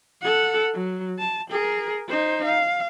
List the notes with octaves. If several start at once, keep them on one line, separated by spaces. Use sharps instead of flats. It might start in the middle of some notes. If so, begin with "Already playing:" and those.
A4 F#5
F#3
A5
G#4 A#4
D#4 C5
F5